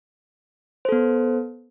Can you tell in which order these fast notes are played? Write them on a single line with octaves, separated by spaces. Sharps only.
C5 A4 B3